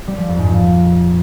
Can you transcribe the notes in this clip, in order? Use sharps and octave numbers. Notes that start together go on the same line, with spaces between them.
G3
F3
F2
G#2
A#2